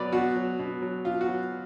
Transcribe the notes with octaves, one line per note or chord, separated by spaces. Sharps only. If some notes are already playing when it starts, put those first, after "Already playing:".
Already playing: B2 F#3 B4 D5
B2 F#4
F#3
B2
F#3
B2 F4
F#4
F#3